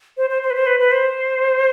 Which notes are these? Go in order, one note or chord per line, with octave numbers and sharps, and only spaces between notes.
C5
C5
C5
B4
C5
B4
B4
C5